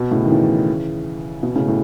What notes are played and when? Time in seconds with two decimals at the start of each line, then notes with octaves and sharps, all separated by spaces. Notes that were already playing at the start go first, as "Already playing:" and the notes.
Already playing: B2
0.11 A2 C#3
0.25 D#3
0.30 C#3 E3
1.43 B2
1.56 A2 C#3
1.68 A2